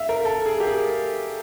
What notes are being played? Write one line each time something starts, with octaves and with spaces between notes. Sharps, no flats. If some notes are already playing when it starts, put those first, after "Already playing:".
Already playing: E5 F5
A#4
A4
G#4
G4
G#4